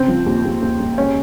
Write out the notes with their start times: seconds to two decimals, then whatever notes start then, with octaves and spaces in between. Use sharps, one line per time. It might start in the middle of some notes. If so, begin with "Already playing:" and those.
Already playing: C#3 C4
0.08 F3
0.26 D#2
0.45 D#2
0.62 D#2
0.79 D#2
0.97 C#2 C#4